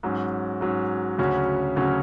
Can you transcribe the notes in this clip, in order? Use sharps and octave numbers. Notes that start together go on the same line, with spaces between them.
G#2 F#3 C#4
G#2 F#3 C#4
D2 C#3 F#3 C#4 F#4
D2 C#3 F#3 C#4 F#4